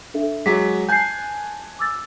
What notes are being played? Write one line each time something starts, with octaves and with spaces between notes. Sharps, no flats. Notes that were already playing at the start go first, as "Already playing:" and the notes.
D4 A4 E5
F#3 G#3 F#5 D6 B6
G#5 A5 F#6 G6 C7
D6 E6 A6